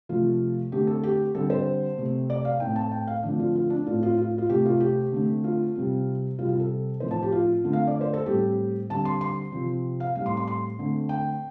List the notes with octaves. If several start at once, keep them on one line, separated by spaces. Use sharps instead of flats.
C3 F3 A3 F4
D3 A3 C4 G4
A4
G4
D3 G3 C4 A4
C5
C3 A3 C4
D5
F5
A2 A3 C4 G5
A5
G5
F5
D3 F3 A3 C4 D4
F4
F4
D4
A2 A3 C4 F4
F4
F4
F4
C3 A3 C4 G4
F4
G4
D3 A3 C4
F4
C3 G3 C4
C3 G3 C4 F4
F4
A4
A2 F3 C4 C5
A5
G4
F4
D3 A3 C4
F5
D5
C5
A4
A2 G3 C4 G4
D3 G3 C4 A5
C6
C6
C3 F3 C4
F5
A2 G3 C4 F5
C6
C6
C6
D3 A3 C4
G5